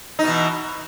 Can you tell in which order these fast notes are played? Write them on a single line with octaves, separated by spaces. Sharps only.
D#4 B2 E3